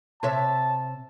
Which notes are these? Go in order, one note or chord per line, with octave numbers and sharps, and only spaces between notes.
C3 C#5 E5 A5